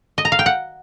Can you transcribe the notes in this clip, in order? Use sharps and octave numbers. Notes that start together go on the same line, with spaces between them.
D#5
A#5
F5
G5
F#5